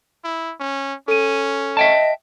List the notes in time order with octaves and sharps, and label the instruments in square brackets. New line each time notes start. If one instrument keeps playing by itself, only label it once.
[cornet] E4
C#4
[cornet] C#4 [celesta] A4 D#7
[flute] D#5 [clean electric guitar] E5 G5 A5